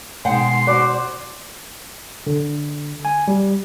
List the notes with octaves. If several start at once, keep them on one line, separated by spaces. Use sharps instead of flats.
B2 D#3 G#3 F#5 G5 C6
F#4 C5 D5 D6
D3
G#5
G3